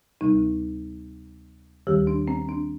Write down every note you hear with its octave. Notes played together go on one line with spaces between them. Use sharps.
D2 C3 G3 D#4
D#2 D#3 G3 G4
D4
C4
D4